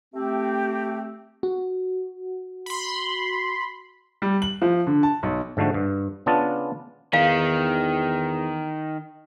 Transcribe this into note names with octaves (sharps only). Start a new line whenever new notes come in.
A3 C4 G4
F#4
B5 C6
G3
F#7
F3
D3
A5
B1
G#2 D3 F3 A3 F#4
G2
C#3 B3 D4 F4 A5
E2 D#3 F5